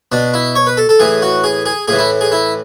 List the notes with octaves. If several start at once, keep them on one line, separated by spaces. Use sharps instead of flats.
B2 D4
E4
C#5
B4
A4
A4
A2 E3 G#4
F#4
G#4
G#4
A2 E3 G#4
E4
G#4
E4